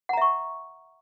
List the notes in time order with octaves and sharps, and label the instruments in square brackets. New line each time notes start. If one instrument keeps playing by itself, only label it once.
[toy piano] F#5
A#5
E5
C#6